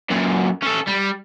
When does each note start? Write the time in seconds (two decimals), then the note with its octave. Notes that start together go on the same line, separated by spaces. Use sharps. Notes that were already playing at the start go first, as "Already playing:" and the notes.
0.11 F#2 A#2
0.62 C#4 A4
0.87 G3